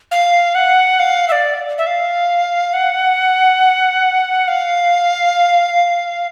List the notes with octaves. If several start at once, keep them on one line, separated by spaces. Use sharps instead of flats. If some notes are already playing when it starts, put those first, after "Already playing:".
F5
F#5
F5
E5
D5
E5
F5
F#5
F5